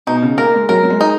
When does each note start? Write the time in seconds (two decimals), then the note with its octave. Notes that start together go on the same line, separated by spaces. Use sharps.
0.07 B2 D#4
0.22 C#3
0.38 A#3 A#4
0.54 G#3
0.69 F#3 A#4
0.83 F#3
0.90 G#3
1.01 D#4